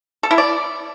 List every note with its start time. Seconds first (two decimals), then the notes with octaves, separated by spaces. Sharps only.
0.23 A4
0.31 E4
0.38 D5